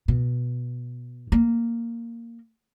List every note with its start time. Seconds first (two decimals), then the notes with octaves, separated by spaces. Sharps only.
0.08 B2
1.32 A#3